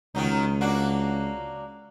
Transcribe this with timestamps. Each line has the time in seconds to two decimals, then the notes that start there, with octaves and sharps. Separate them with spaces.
0.15 C#2 D#3 F#3 D#4
0.61 A#3 D4 F#4